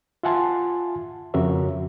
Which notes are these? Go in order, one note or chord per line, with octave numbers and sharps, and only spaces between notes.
F4 E5 F#5 G#5 A5 C6
F2 C#3 F#4 A#4 C#5 E5